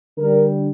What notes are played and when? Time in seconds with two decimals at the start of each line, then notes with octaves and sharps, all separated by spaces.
0.17 D3 G3 A#4